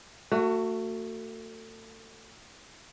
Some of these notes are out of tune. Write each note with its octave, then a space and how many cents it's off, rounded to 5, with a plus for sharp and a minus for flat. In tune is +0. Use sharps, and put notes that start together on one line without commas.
A3 +35 F#4 +0